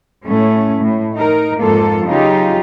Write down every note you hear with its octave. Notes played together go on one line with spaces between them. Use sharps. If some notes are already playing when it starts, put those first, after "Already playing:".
A2 A3 C#4
A2
D#4 A#4
F2 G#2 A#3 F4 A4
C#3 F#3 D#4 F4 G4